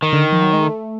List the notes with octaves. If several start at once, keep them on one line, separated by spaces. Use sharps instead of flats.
D#3
D3
F3
F#3
G#3
A3